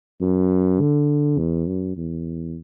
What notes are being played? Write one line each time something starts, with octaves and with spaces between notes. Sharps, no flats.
F#2
D3
E2
F#2
E2